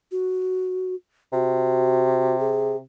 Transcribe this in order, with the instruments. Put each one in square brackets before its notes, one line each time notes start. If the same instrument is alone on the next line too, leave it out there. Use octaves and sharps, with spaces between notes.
[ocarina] F#4
[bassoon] C3 [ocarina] F#4
[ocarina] G#4